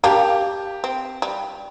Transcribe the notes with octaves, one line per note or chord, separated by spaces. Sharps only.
A#3 D4 G4
C4
G3